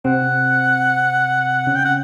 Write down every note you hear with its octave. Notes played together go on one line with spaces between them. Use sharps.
C3 C4 F#5
C#3 C#4
G5
F#5